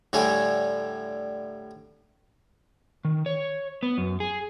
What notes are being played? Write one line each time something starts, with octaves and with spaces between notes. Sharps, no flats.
A2 D3 G3 D4 C#5 G#5
D#3
C#5
B3
F#2
G#4